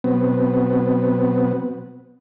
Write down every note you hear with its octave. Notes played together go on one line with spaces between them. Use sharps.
B2 F#3 B3 C4